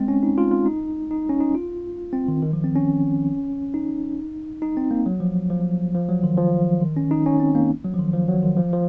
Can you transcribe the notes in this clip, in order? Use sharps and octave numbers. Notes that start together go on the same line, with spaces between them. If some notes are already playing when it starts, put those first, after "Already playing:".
Already playing: G#3 C4
C#4
D#4
F4
F4
D#4
D#4
C#4
D#4
F4
C4
D#3
D#3
F3
C4
C#4
D#4
D#4
C4
A#3
F#3
F3
F3
F3
F#3
D#3
F3
D#3
C#4
D#4
C#4
C4
A#3
F#3
F3
D#3
F3
F#3
D#3
F3
F3